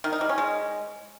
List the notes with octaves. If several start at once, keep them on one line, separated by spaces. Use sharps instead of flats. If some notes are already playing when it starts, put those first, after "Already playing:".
D#3
D#4
G3
C#4
G#3